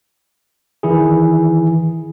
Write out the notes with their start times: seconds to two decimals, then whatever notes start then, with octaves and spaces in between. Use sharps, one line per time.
0.83 D#3 E3 E4 G#4